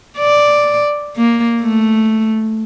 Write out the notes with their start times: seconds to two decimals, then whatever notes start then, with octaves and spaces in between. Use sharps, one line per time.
0.18 D5
1.17 A#3
1.62 A3